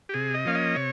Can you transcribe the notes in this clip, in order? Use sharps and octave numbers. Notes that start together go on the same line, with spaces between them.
G4
C3 G#4
D#5
F3 A#3 C#4 F5
D#5
C3 C#5